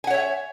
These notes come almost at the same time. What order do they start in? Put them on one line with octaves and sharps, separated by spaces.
G#5 F#5 C#5 E5